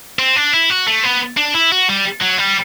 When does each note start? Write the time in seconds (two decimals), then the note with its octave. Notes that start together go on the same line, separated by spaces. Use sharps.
0.19 C4
0.36 D4
0.54 E4
0.70 F#4
0.87 A3
1.03 B3
1.37 D4
1.54 E4
1.72 F#4
1.89 G3
2.22 F#3
2.39 G3